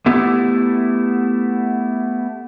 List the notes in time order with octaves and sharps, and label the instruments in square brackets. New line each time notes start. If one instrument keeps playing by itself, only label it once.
[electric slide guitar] A3 B3 E4 G4 A4